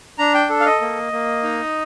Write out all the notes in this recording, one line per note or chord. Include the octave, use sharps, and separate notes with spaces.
D4 A#5
G5
A4
F5
D#5
A#3
A#3
D#4